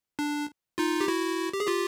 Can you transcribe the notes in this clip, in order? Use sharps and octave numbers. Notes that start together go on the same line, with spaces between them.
D4
D#4 F4
G4
E4 F#4
G4
G#4
F4 G4